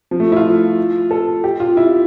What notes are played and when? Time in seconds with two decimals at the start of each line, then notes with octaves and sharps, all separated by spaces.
0.11 F3
0.20 A3
0.32 E4
0.36 F4
1.11 A4
1.44 G4
1.60 F4
1.77 E4